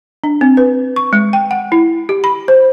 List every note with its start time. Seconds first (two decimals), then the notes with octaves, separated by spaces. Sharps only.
0.24 D4
0.41 C4
0.57 B4
0.96 C#6
1.13 G#3
1.33 G5
1.51 F#5
1.72 E4
2.09 G4
2.24 B5
2.48 C5